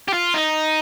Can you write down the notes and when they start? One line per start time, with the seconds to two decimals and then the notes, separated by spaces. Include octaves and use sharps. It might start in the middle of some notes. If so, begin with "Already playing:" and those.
0.08 G4
0.13 F4
0.34 D#4